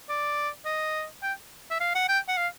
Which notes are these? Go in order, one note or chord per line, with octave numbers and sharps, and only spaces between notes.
D5
D#5
G5
E5
F5
F#5
G5
F#5
F5